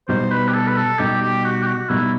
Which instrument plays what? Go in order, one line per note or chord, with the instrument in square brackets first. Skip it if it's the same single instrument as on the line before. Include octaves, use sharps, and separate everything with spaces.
[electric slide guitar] B2 G3 D#4 [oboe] C5
[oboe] B4
G4
A4
B4
A4
[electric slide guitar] B2 G3 D#4 [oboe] G4
[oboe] G4
F#4
G4
F#4
[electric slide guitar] B2 G3 D#4 [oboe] E4